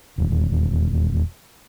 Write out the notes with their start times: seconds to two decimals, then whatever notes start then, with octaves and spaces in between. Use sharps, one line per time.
0.18 E1 D#2